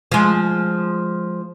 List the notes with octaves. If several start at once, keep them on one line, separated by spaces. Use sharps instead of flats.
F3 G#3